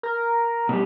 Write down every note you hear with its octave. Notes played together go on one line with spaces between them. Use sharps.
A#4
B2 G3